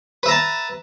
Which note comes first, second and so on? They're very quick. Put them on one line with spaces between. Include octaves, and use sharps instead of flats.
B4 E5 A#5 A5